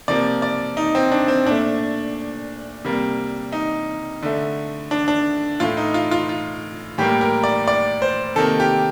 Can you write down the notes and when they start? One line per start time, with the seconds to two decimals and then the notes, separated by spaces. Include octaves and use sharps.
0.08 C3 F3 A#3 D5
0.42 D5
0.77 D#4
0.95 C4
1.12 D4
1.28 C4
1.46 A#2 A3 D4
2.85 C3 G3 A#3
3.52 D#4
4.22 D3 A3
4.91 D4
5.08 D4
5.60 A2 A3 F4
5.77 D#4
5.94 F4
6.11 F4
6.29 F4
6.98 A2 G3 A#3 G4
7.21 A#4
7.44 D5
7.68 D5
8.02 C5
8.36 C3 D#3 A#3 A4
8.60 G4